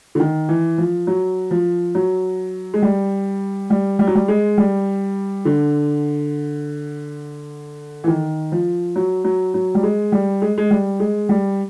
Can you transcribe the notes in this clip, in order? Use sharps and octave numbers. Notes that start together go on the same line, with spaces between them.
D3
D#3
E3
F3
F#3
F3
F#3
G#3
G3
G3
G3
F#3
G3
G#3
G3
D3
E3
D#3
F3
F#3
F#3
F#3
G3
G#3
G3
G#3
G#3
G3
G#3
G3